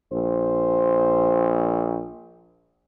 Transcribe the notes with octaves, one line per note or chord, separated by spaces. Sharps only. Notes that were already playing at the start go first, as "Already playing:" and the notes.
A#1 C5